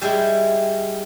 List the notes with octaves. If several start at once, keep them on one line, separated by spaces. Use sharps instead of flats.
G3 G#3 E4 G5